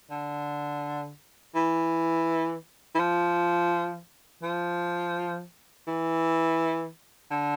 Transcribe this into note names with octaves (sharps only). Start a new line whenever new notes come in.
D3
E3
E3
F3
F3
E3
D3